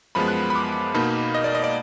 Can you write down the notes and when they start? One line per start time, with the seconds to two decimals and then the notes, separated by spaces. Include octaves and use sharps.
0.15 F#2 F3 G#3 B3 B5
0.28 F#6
0.50 B5
0.55 D6
0.94 B2 A#3 D#4 B5
1.34 D#5
1.44 D5
1.55 D#5
1.64 D5